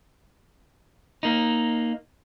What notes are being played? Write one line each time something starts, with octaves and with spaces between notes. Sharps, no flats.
A#3 D#4